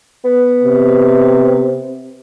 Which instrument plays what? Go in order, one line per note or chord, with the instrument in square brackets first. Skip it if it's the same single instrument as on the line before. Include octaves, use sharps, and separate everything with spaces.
[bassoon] B3
[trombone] C3